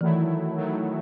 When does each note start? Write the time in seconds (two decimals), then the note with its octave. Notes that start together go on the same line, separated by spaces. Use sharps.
0.01 D#3 E3 F#3 A3 E4
0.58 D#3 F#3 A3 E4